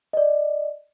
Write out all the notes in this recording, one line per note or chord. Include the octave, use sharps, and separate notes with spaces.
D5 D#5